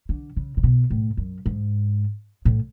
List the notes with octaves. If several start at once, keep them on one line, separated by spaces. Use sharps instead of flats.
D3
C#3
C#3
B2
A2
F#2
G#2
A2